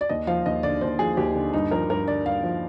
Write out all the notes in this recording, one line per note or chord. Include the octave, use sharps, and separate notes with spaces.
D5
D#2 D#5
F3 F5
D#2 D#5
D3 D5
D#2 C5
F3 G#4
D#2 G4
D3
G2 D#4
F3 A#4
G2 A#4
D3 D5
G2 F5
F3